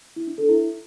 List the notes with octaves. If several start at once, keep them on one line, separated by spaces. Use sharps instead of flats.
E4
D4
A4
E4